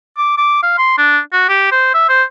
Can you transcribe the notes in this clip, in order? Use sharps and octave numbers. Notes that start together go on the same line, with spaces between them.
D6
D6
F5
C6
D4
F#4
G4
C5
E5
C5